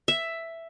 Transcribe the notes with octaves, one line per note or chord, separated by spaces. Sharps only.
E5